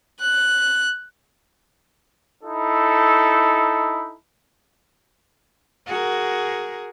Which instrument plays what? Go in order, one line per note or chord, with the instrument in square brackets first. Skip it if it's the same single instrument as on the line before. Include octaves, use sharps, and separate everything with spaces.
[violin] F#6
[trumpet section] D#4 E4 A4
[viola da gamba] F#4 G#4 A#4